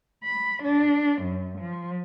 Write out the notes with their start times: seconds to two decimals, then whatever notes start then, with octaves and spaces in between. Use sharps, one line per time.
0.25 B5
0.64 D4
1.23 F#2
1.59 F3